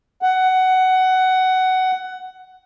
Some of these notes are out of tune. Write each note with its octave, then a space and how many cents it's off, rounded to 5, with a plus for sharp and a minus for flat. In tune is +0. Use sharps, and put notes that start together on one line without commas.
F#5 +15